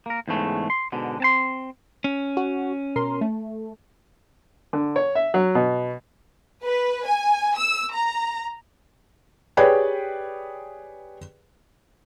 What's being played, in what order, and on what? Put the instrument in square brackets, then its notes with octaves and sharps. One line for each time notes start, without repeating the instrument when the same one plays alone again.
[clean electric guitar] A#3 A#4
E2 G#2 C#3 A3
C6
G#2 B2 D3
C4 A5 C6
C#4
[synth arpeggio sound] F#4
B2 A#4 C6
A3
[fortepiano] D3
C#5
E5
F#3
B2
[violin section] B4
G#5
E6
A#5
[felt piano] G4 G#4 B4 C#5 D5 G5